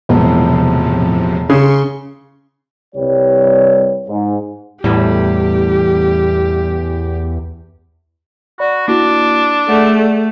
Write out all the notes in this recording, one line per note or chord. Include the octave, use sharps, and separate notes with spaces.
E1 A2 C3 F3
C#3 C6 C#6
C2 G3 B4 C#5
G#2
E2 A2 E3 G3 G4
F#4 D5 B5
A#3 D4 E4 F#4
A3 G#4 D5 F#5